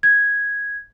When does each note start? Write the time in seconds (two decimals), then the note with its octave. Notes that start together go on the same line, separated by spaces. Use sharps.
0.03 G#6